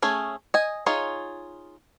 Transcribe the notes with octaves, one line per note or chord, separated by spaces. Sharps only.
A3 C#4 G#4
D#5 G#5
D#4 F4 G#4 C#5